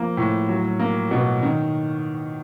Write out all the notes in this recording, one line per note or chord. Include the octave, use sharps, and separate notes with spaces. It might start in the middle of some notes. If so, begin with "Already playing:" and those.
Already playing: F3 A#3
A2
F#3
A#3
B2
D#3